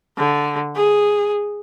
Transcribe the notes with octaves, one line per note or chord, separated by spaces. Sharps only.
D3
G#4